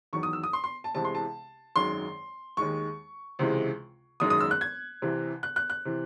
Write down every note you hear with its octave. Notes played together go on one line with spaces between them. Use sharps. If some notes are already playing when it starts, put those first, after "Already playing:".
E2 D#3 F#3 C#6
D#6
E6
D#6
C6
C6
A5
C2 C3 E3 G#3 A5
C6
A5
G#1 F#2 D#3 G#3 C6
D#2 D#3 G#3 C#6
C#2 C3 E3 G#3
F#1 F#2 D#3 G#3 D#6
D#6
E6
F#6
G#6
C2 C3 E3
F#6
F#6
F#6
C3 E3